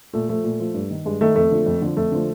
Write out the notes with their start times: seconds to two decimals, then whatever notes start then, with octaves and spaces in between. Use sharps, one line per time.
0.13 A#2 A3
0.29 F3 A3
0.44 A#2
0.60 F3
0.74 G2
0.90 D#3
1.05 G2 G#3
1.21 D#3 A3
1.36 F2 A3
1.51 D3 F3
1.66 F2
1.82 D3 F3
1.97 F2 A3
2.12 D3 F3